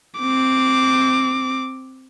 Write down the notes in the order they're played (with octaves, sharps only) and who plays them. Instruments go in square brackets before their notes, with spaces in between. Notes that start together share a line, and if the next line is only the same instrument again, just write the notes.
[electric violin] C4 D6